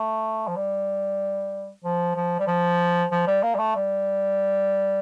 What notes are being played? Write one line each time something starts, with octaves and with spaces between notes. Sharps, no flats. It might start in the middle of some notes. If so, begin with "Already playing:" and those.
Already playing: A3
F3
G3
F3
F3
G3
F3
F3
G3
A#3
G3
A3
G3